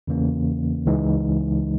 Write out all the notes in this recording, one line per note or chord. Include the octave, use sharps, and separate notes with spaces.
E2 C#3 E3 A#3 C#4
C#2 C#3 E3 G#3 D#4